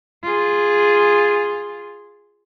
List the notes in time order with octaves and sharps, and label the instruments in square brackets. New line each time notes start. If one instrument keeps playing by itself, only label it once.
[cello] F4 G#4